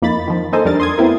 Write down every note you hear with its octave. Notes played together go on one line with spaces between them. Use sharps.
F2 A#3 D#4 B5 A6
D#3 F3
A#3 D#4 A4 C5 D#5 G#5
F2 G3 D4 A#4 A6
C6 D#6 G#6
A3 B3 C4 E4 A#4